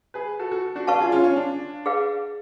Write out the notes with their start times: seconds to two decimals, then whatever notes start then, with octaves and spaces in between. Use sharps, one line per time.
0.14 G#4 B4
0.39 F#4 A4
0.51 F#4 A4
0.75 D4 F#4
0.87 D4 B4 F5 A5 C#6
1.00 F4 G#4
1.12 C#4 F4
1.24 C#4
1.36 D4
1.86 G#4 B4 F5